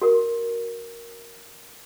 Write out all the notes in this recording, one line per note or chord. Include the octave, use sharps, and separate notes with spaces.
F#4 A#4